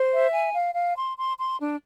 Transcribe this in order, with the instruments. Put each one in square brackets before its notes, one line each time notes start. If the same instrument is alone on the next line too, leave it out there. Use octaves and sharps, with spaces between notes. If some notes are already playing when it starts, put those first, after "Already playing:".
Already playing: [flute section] C5
E5
G#5
F5
F5
C6
C6
C6
D4